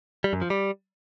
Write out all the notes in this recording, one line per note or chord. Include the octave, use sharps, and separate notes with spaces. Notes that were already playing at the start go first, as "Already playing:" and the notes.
G3
F#2
F3
G3